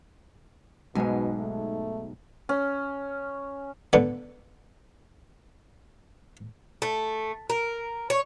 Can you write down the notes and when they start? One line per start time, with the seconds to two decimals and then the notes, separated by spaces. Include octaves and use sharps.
0.95 B1 G#2 B2 G#3 G#5
1.39 A3
2.49 C#4
3.93 D3 B3
6.82 A3
7.50 A#4
8.10 C#5